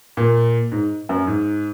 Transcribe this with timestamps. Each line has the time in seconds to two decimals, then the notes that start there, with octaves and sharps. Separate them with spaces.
0.17 A#2
0.72 G#2
1.09 F#2
1.27 G#2